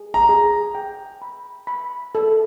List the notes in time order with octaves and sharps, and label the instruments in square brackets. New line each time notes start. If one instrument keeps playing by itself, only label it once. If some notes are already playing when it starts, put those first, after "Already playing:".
Already playing: [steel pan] G#4
[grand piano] A#5
[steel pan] G#4
G5
B5
B5
A4